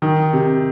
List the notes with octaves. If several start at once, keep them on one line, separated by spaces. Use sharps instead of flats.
D#3
C3